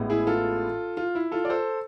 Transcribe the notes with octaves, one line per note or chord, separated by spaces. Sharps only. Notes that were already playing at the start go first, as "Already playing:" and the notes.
Already playing: A1 A2 G#3 B3
E4 G#4
F4 A4
F4
E4
F4 A4
D5
A4 C5